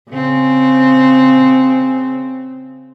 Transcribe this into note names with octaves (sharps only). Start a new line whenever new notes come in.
C#3 C4